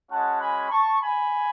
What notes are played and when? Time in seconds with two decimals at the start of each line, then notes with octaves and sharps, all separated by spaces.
0.11 G#3 C#4 F#4 F#5 A5
0.41 G#5 B5
0.70 A5 C#6
1.00 G#5 B5